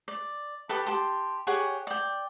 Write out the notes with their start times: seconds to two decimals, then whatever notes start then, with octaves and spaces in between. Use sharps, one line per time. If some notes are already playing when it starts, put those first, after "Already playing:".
0.08 D5
0.69 G4 A4 B4
0.86 G4 A5 C6
1.47 G4 G#4 C#5 F#5
1.87 D5 G5